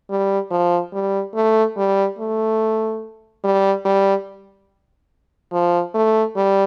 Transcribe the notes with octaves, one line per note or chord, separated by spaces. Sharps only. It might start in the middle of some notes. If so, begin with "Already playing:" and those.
G3
F3
G3
A3
G3
A3
G3
G3
F3
A3
G3